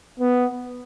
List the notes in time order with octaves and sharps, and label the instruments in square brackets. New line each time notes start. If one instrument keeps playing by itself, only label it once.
[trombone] B3